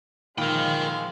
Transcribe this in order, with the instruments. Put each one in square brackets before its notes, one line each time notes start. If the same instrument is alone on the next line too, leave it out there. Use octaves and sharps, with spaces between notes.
[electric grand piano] A#2 D#3 B5 [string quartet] F3 G#3 [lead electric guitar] A#4 G5 [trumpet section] F5